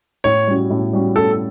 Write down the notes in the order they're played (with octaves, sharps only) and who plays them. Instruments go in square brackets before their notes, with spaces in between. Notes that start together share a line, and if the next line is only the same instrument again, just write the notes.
[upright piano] A2 [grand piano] C#5
[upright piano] G3 C#4 F#4
A2
G3 C#4 F#4
[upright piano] A2 [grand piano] A4